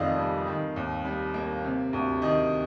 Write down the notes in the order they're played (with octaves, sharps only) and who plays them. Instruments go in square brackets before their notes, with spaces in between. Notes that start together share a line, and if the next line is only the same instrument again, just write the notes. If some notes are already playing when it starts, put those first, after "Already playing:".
Already playing: [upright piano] F1 F2 D#3 D5 D#5 F5
G3
D#3
D#2
G3
A#3
C3
D2
D#3 D#5